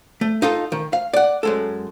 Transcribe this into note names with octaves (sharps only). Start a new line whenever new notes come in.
A3
D#4 F4 A4
D#3
F5
D5 F#5
F#2 G#3 A4